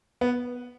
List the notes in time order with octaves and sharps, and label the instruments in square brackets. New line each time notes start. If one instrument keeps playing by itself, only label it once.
[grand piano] B3